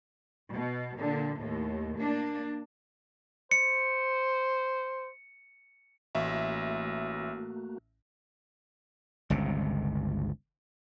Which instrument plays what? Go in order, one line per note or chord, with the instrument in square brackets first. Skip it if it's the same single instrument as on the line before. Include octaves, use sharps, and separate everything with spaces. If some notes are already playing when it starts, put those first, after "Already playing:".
[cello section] B2
A#2 D3
D#2 A2
A#3 D4
[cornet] C5 [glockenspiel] C#7
[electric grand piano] A1 E5 [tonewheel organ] A3 A#3 F#4
[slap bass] G1 C#2 C3